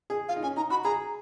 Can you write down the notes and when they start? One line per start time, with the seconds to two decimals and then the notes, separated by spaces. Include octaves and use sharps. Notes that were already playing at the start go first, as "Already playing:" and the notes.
0.10 G#4
0.29 F4 F5
0.36 D#4
0.43 C#4 G#5
0.56 D#4 A#5
0.70 F#4 B5
0.84 G#4 A#5